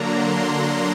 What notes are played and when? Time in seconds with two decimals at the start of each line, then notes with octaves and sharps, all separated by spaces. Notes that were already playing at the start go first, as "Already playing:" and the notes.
Already playing: D3 F#3 A#3 D4 A#5
0.09 C6
0.46 C6